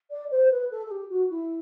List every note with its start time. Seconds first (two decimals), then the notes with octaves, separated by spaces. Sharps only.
0.10 D5
0.30 C5
0.50 B4
0.71 A4
0.86 A4
0.91 G4
1.10 F#4
1.30 E4